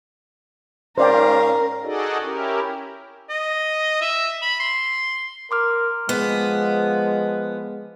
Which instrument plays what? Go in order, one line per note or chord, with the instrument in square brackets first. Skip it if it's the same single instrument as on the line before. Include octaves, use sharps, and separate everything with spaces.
[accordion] G#2 C#4 F5 [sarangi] A#4 [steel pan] C5 D5 G5
[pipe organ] D#4 F#4 G#4 A4 D5 D#5
C#4 E4 G4 A#4
[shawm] D#5
E5
B5
C6
[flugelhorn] A#4 [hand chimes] C6 D6 F6
[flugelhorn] F3 [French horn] G#3 [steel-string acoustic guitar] B3